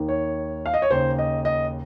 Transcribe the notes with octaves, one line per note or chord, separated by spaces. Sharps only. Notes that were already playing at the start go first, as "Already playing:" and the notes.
Already playing: D#2 D#3
C#5
F5
D#5
C#5
D#2 C#3 C5
D#5
D#5